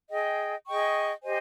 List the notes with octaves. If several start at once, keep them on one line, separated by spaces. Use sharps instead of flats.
G#4 D#5 G5
G#4 D#5 G5 C#6
G4 C5 D#5 G#5